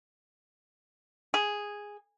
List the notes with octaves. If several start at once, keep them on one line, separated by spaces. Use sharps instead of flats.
G#4